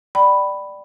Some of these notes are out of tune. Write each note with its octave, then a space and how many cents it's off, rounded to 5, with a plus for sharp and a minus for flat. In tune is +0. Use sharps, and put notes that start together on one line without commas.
D5 +10 G5 -25 B5 +0